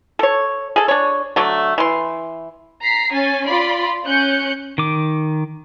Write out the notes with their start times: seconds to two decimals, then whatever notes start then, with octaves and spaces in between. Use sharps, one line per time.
0.19 A4 C#5
0.76 G#4 A4
0.88 D4 C#5
1.36 D3 F#3 A3
1.78 E3 C6
2.83 A#5 B6 C7
3.13 C#4 G#5 A6
3.45 F4 D5 B5 C6
4.06 C#4 F#6 G6 C#7
4.78 D#3 D6